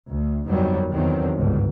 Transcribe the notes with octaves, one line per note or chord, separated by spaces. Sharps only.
D2
G1 F2 D#3 F#3 G3
E2 D3 D#3 F#3 C4
G1 C#2 G#2